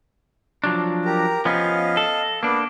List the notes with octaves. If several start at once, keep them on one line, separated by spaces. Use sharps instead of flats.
F3 F#3 D4
G4 A#4 A#5
F3 B3 C#4 D#5 F5
A4
A#3 B3 D4